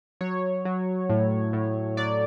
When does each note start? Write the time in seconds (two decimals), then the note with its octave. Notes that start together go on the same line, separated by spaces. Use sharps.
0.21 F#3 C#5
0.65 F#3
1.09 A2
1.53 A2
1.97 F#3 D5